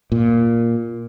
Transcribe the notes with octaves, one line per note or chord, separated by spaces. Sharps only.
A#2